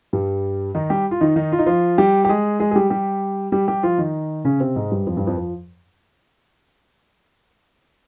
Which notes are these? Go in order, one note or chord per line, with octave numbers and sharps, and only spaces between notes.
G2 G3
D#3 D#4
G3 G4
F4
D#3 D#4
D#3 D#4
F4
D#4
F3 F4
G3 G4
G4
G#3 G#4
G#3 G#4
G#4
G3 G4
G3 G4
G3 G4
G3 G4
F3 F4
D#3 D#4
C#3 C#4
C3 C4
G#2 G#3
G2 G3
F2 F3
G2 G3
F2 F3
F3